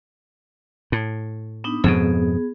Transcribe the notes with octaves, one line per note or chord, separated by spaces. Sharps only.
A2
B3 D4 D#4
F2 G#2 B2 B3 G#4